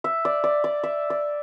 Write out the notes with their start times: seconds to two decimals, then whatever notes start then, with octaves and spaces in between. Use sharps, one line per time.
0.04 E5
0.25 D5
0.44 D5
0.64 D5
0.84 E5
1.10 D5